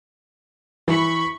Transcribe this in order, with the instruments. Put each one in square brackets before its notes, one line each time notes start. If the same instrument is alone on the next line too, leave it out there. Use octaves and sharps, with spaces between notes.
[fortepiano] E3 [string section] B5 C#6